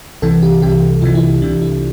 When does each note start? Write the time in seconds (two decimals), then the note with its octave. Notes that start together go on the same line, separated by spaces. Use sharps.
0.22 C2 C3 E3 A4
0.42 G4
0.62 C2 C3 E3 G4
1.02 C2 C3 E3 F4
1.15 E4
1.42 C2 C3 E3 D4
1.62 E4